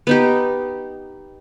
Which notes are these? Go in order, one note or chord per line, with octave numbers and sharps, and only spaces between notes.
B3 D#4 G4